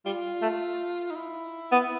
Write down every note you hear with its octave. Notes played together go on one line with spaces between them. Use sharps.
G3 F4
A3
D#4
E4
B3